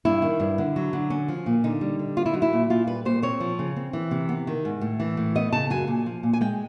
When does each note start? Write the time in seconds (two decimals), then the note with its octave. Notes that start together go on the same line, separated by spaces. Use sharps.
0.05 G2 E4
0.22 D#3
0.40 G2
0.58 D3
0.76 F#3
0.93 D3
1.10 C#4
1.28 F3
1.46 A#2
1.64 D3 D#4
1.81 G3
1.99 D3
2.16 C4 F4
2.26 E4
2.33 F#3 D#4
2.42 E4
2.53 A#2
2.70 A#2 F4
2.87 G3 B4
3.05 A#2 C5
3.22 C4 C#5
3.40 F3
3.59 C#3
3.76 C4
3.93 E3
4.11 C3
4.29 B3
4.47 D#3
4.65 G#2
4.81 A2
5.00 E3
5.17 A2
5.35 B3 D#5
5.52 C#3 A5
5.70 F#2 G#5
5.88 A#2
6.06 F3
6.23 A#2
6.33 G#5
6.41 G#3 G5